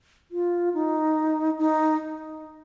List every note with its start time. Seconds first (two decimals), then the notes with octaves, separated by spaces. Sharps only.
0.31 F4
0.74 D#4
1.58 D#4